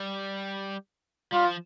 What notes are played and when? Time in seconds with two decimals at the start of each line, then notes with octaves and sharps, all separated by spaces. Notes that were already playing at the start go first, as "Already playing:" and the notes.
Already playing: G3
1.32 G3 F4
1.45 F3